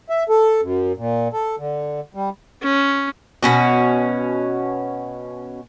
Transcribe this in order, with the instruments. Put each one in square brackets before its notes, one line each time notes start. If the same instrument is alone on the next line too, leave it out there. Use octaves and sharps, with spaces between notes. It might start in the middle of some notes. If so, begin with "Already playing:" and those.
[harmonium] E5
A4
F#2
A#2
A4
D3
G3
[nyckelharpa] C#4
[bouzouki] B2 C#4 F#4